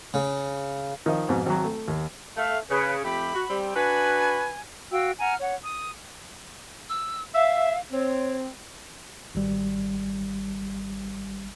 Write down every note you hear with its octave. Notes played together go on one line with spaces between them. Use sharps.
C#3
D#3 F3 D#5
F2 G#2 B2
G#1 F#3
A3
D#2
A3 F5
C#3 B4
F2 A3 G4 B5
F#4
G3 C4
D4 F#4 B4 G#5
F#4 F5 G5 E6
F#5 G#5 A#5 F6
C#5 F#5
D#6
E6
E5 F5
C4 C#5
G#1 G3